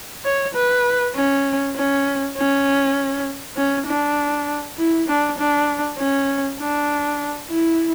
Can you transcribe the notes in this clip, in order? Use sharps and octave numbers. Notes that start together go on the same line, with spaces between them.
C#5
B4
C#4
C#4
C#4
C#4
D4
E4
D4
D4
C#4
D4
E4